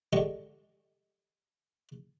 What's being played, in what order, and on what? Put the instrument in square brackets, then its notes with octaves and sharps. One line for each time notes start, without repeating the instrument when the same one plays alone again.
[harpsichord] D3 G#3 G4 C#6